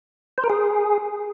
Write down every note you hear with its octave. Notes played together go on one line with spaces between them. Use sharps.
C5
A#4
G#4